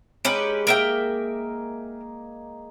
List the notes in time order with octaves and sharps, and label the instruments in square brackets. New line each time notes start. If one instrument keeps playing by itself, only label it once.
[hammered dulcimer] G#3 D#4 D5 [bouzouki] C#4 G4 B4
[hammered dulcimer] A#3 G#4 [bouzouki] A#4 E5 G5